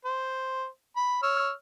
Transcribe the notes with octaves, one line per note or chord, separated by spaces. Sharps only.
C5
B5
C#5 E6 F6